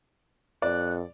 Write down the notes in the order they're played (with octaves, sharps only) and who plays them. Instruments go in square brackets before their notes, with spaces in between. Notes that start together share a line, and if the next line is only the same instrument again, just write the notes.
[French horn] F2 [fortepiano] D5 [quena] F#6